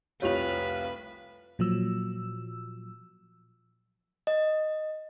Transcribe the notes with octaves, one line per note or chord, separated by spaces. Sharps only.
F1 C2 F4 G4 B4 C#5 F5 F7
A#2 F3 F#3 E6
D#5